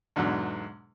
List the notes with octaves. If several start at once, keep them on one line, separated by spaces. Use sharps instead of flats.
E2 G#2 B2 D3 F#3